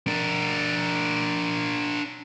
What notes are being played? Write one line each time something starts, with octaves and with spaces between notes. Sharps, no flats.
D4 A#4